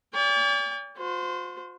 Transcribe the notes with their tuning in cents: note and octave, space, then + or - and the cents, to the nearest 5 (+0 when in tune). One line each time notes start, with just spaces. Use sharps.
D5 -40 G5 +45
F4 +45 C5 -25